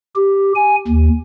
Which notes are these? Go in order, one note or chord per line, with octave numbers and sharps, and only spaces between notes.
G4
G#5
D#2